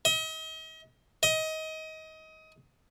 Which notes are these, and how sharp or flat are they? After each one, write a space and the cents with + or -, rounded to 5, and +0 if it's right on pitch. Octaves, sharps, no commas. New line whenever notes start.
D#5 +40
D#5 +25